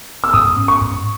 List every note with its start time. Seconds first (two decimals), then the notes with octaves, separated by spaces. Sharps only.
0.24 E6
0.33 G#2 D#6
0.57 C#4
0.68 C#6
0.81 G#2